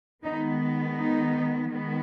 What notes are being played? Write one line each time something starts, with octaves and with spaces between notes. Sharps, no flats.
D#3 G#3 B3 D#4
D#4
D#3 G#3 B3